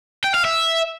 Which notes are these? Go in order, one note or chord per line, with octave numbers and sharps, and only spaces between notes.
G5
F5
E5